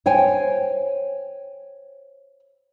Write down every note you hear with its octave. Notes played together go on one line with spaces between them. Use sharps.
C5 C#5 G5 G#5